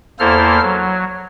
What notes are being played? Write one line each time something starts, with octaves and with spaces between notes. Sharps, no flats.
E2 A#3 E4 A4 C5 F6
F#3